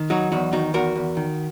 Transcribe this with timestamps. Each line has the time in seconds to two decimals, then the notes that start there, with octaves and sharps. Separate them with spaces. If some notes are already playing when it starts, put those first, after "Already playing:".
Already playing: D#3
0.10 F#3 D#4 F#4
0.32 E2 D#4 F#4
0.53 D#3 D#4 F#4
0.74 E2 F#4 A#4
0.96 E2
1.17 D#3